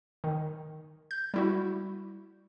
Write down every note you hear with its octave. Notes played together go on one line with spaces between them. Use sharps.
D#3
G6
G3 E4 F#4